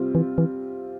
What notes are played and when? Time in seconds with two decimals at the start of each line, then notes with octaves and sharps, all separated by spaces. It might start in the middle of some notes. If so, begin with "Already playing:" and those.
Already playing: C3 G3 C4 F4
0.15 E3
0.38 E3